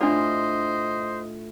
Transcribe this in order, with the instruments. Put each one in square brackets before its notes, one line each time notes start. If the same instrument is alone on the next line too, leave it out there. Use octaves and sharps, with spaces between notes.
[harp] A2 F4 [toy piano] D4 D5 [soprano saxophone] C5 [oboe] D#5